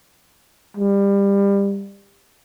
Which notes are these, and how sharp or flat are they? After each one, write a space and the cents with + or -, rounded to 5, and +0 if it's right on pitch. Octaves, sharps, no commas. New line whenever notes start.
G3 +25